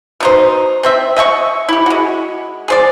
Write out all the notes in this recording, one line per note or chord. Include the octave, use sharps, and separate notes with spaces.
B2 D#4 C5
C4 C5 E5
D#5 E5 G5 C#6
E4 G4
G#3 F#4
G#4 C5 D5